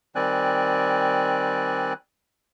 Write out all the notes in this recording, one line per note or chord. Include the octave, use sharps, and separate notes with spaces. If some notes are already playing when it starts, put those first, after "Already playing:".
D#3 G3 C4 D5 G#5 F#6